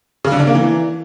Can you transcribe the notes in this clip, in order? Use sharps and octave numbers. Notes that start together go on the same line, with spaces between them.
C#3
D3
D4
A#3
E3